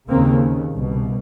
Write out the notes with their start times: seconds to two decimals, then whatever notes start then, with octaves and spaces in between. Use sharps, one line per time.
0.09 D#2 C#3 A#3 C4
0.72 C2 B2